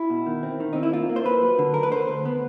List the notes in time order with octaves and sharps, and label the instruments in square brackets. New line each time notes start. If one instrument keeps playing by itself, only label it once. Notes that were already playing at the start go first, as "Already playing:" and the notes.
Already playing: [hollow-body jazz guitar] E4
B2
D#3
C4
D#3
C4 D#4
E4
A#3 F4
A#3
C5
A#3 B4
F#3
D3
D2 A#4
B4
D3 C5
D2
B3